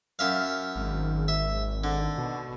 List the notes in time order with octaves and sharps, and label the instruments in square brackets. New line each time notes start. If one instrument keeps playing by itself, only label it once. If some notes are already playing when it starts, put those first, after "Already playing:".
[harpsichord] F#2 E5 F5
[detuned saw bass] G#1
[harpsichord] E5
D3
[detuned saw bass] B2